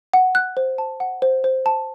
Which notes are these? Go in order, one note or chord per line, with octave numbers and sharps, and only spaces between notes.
F#5
F#6
C5
A5
F#5
C5
C5
A5